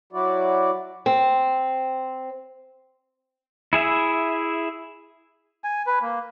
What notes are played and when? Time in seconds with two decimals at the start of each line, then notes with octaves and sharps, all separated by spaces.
0.13 F#3 E4 F#4 D5
1.06 C4
3.73 E4 G#4 E5
5.64 G#5
5.87 B4
6.02 A#3